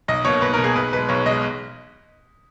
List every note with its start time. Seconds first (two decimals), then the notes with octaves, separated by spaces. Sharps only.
0.08 B1 D#5
0.25 B2 A#3 C#5
0.41 B1 B4
0.53 A#4
0.58 B2
0.63 A#3 G#4
0.76 B1 B4
0.93 B2 G#3 B4
1.09 B1 C#5
1.26 B2 G#3 D#5